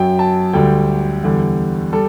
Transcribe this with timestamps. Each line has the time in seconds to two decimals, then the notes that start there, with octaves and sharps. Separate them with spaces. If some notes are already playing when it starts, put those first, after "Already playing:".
Already playing: F#2 F#3 G5
0.19 A5
0.53 D2 D3 G3 G5
1.24 E2 D3 G3
1.93 G3 A4